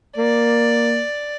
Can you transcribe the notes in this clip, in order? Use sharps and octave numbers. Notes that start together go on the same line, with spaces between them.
A#3 D5